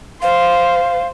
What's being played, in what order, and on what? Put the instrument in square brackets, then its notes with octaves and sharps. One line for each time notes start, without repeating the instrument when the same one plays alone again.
[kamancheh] C5 [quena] F5